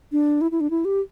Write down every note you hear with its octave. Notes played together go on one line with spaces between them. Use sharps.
D4
E4
E4
D4
E4
G4